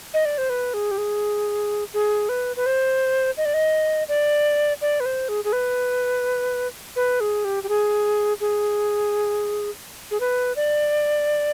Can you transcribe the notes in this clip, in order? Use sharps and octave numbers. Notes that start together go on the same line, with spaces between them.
D#5
D5
C5
B4
G#4
G4
G#4
G#4
B4
B4
C5
D#5
D5
D#5
D5
D5
B4
C5
G#4
G#4
B4
B4
G#4
G4
G4
G#4
G#4
G#4
B4
D5